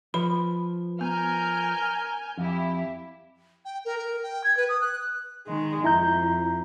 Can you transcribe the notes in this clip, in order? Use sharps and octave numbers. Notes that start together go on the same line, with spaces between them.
F3 B4 B5
B3 A#4 G#5 F6 G6
F2 E4 G4
G5
A#4
A#4
G5
G#6
B4
D#6
F#6
D#3 G#3
F2 E4 A#5 G6